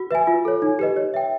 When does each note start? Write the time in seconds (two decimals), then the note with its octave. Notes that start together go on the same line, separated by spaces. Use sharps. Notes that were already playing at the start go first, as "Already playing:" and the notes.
Already playing: F#4
0.11 B4 E5 G#5
0.27 F4
0.45 A4 C#5
0.62 D#4
0.79 G4 B4 D#5
0.96 C#5
1.14 E5 G5